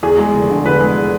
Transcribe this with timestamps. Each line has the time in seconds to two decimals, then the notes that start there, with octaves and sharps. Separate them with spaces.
0.03 E2 G#4
0.19 G#3
0.34 F1
0.50 D3
0.65 E2 B4
0.81 G#3